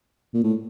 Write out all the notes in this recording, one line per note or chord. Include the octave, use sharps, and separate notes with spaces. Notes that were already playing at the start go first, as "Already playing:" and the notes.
A#2
A2